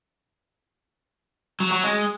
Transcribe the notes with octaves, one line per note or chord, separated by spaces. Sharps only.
F#3
F#3
G#3